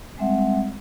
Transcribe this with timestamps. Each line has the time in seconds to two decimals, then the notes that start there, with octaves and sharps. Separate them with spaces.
0.18 G3 G#3 C4 E5 F#5